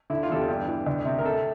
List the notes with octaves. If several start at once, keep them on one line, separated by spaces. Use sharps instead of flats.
D3 E4
F4
E2 A4
G4
G2
E3
D2
C3
A#4
C3 A4